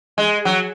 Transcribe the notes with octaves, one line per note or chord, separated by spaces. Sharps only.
G#3
F#3